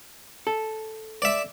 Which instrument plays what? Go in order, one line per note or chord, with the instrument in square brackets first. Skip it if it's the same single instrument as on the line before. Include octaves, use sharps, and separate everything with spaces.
[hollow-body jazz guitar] A4
[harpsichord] D5 E5